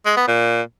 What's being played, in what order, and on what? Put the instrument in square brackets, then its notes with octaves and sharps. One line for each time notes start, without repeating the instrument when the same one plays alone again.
[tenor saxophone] G#3
B3
A#2